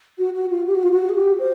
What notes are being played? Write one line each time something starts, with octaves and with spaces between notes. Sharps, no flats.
F#4
F#4
F4
G4
F#4
F4
F#4
G#4
G4
C5